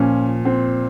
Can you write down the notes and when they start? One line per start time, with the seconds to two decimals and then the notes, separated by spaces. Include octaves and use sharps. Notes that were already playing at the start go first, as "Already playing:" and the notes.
Already playing: A#2 F3 C#4
0.45 C4